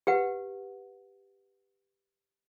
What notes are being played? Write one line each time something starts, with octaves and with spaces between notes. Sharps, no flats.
G4 B4 F#5